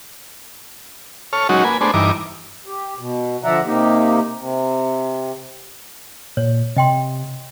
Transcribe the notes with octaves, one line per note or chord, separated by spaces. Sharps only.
A4 C#5 F6
F#3 G#3 C#4 D#4 F#4
A#3 B4 G#5
A3 B3 D4 G#4 C5
G2 E3 D#4 A#5 D6
G4
B2
D3 F3 D5 E5 F#5 A#5
C3 A#3 D#4 G4
C3
A#2 C#5
C3 D#5 G5 C6